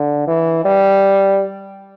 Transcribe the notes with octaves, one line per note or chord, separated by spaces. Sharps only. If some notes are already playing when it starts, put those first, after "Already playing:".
Already playing: D3
E3
G3